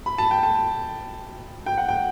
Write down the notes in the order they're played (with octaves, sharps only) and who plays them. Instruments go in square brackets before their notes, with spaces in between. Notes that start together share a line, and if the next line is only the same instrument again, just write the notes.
[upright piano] B5
A5
G5
A5
G5
F#5
G5